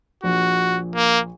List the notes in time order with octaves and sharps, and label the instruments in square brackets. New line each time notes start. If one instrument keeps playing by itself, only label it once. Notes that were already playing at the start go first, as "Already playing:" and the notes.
[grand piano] A#1 F3 [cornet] F#4
[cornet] A#3